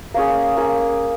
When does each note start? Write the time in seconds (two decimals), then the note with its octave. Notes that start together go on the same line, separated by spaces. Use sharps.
0.14 A#3 C#4 G#4
0.57 A#3 C#4 G#4